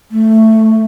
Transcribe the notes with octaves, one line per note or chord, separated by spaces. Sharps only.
A3